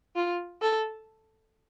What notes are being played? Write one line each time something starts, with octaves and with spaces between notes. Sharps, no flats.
F4
A4